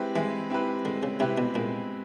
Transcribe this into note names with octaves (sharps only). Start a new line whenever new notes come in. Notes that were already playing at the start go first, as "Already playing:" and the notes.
Already playing: G#3 C4 E4 G4 B4
E3 G#3
C4 E4 G4 B4
D3 G#3
C#3
C3 C4 E4 G4 B4
B2
A#2 G#3